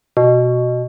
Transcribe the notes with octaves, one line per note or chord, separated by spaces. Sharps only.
B2